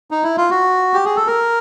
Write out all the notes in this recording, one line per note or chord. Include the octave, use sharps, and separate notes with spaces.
D#4
E4
F4
F#4
G4
G#4
A4
A#4